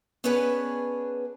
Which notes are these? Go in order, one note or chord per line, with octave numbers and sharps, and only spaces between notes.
B3 C#4 D4 G#4 B4 C#5